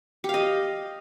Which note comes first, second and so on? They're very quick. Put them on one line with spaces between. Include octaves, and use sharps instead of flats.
G4 F5 D#5